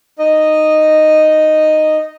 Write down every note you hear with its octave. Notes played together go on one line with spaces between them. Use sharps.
D#4 D#5